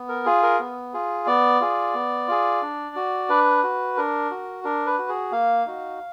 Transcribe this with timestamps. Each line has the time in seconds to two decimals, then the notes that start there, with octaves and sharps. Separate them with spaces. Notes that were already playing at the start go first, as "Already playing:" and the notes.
Already playing: B3
0.09 A#4
0.26 F4 G#4
0.43 A#4
0.60 B3
0.94 F4 G#4
1.27 B3 D5
1.61 F4 G#4
1.94 B3
2.28 F4 G#4
2.62 D4
2.96 F#4
3.29 D4 B4
3.63 F#4
3.97 D4 A#4
4.31 F#4
4.64 D4 A#4
4.86 B4
4.98 F#4
5.09 G#4
5.32 A#3 F5
5.66 D#4 F#4